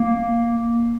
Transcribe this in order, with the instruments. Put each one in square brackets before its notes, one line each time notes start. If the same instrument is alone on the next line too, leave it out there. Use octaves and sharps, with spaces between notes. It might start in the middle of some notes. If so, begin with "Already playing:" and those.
Already playing: [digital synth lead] A#3